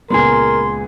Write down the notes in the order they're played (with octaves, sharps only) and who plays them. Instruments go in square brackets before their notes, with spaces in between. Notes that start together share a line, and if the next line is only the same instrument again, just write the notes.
[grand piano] C#2 A#2 B3 [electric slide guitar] G#3 G#4 [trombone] A#4 [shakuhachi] C6